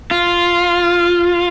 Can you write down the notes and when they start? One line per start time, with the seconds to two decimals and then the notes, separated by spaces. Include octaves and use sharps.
0.11 F4